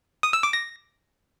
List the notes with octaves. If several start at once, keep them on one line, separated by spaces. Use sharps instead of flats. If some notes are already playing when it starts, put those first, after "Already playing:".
D#6
E6
D6
A#6